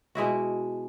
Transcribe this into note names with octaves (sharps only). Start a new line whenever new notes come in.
B2 G#3 E4 F#4